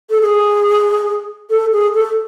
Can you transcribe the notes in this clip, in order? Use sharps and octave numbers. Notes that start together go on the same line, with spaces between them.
A4
G#4
A4
G#4
A4